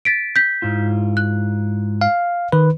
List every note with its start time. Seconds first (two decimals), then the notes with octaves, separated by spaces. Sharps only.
0.05 A6 B6 D7
0.36 G6 B6
0.62 G#2 E4 F4
1.17 F#6
2.01 F5
2.52 D#3 B4